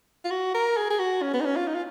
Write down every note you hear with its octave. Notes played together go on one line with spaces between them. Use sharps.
F4
F#4
A#4
G#4
G#4
F#4
C#4
B3
D#4
C#4
F4
D#4
F4